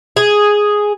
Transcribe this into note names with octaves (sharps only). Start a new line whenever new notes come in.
G#4